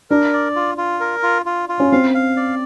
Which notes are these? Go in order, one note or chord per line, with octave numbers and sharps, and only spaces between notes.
D4 A#4
D5
F4
F4
A#4
F4
F4
F4
C#4
C4 F5
F5
D5